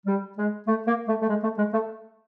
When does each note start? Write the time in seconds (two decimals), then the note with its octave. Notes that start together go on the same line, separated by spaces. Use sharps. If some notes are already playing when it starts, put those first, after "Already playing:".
0.06 G3
0.37 G#3
0.67 A3
0.87 A#3
1.07 A3
1.21 A3
1.28 G#3
1.43 A3
1.58 G#3
1.74 A3